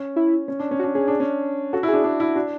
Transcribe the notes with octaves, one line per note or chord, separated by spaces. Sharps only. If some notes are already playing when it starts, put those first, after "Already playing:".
Already playing: C#4
E4
C#4
D4
C#4
F#4
D4
C#4 G#4
D4
C#4
F#4 A4
E4
D4 G#4
D4
E4
D4 F#4